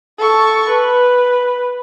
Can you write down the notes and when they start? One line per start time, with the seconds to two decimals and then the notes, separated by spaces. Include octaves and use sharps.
0.18 A4 C#6
0.69 B4